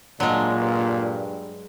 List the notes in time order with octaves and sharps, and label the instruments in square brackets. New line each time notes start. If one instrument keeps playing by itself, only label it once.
[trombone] A#2 [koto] F#3 G#3 [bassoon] D4
[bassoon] G2